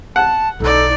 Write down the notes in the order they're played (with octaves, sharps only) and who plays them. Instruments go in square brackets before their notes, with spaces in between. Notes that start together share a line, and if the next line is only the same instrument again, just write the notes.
[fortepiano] F#5 [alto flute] A5
[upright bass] B1 [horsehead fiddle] D#4 D5 [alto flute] A4